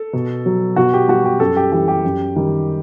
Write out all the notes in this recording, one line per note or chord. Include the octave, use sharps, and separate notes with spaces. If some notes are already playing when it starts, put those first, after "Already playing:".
Already playing: A4
B2
F#3
B2 F#4
G4
G3 F#4
G4
F#2 A4
G4
E3 G3 G4
G4
F#2
D#3 G3